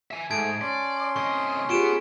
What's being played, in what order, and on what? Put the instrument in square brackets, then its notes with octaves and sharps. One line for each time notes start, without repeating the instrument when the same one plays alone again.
[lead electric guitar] E5 G#5
[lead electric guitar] G#2 [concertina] A3 G#4 [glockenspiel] A5 G#6 D7
[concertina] C#4 C6 [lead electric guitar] D5
[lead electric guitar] C2 D#5 [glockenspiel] C#6
[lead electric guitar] B3 [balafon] F4 G4 G#4 [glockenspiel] C#6 D7 E7